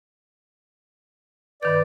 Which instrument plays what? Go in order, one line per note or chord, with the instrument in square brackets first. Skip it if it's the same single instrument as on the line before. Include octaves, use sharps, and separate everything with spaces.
[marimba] G2 D#3 G6 [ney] B4 [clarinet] D5